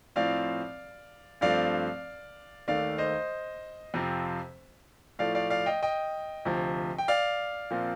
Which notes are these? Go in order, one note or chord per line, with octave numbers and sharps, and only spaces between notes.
A2 F3 C4 D5 F5
G2 F3 A3 C4 D5 F5
D#2 D#3 A3 D5 F5
C5 D#5
F2 C3 F3 C4
A2 F3 A3 D5 F5
D5 F5
D5 F5
D#5 G5
D#5 G5
D2 C3 F3
G5
D5 F5
A#2 F3 C4